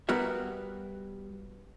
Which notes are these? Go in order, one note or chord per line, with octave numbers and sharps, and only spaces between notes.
G3 B3 F#4 A#4 E5